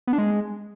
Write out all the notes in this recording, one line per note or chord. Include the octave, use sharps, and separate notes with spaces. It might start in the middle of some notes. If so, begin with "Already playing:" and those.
B3
D4
G#3